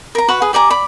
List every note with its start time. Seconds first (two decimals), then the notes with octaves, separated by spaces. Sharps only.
0.15 A#4 A#5
0.28 F#4 B4 F#5 C#6
0.41 G#4 B4
0.53 G4 D5 G#5 A#5
0.70 D5 B5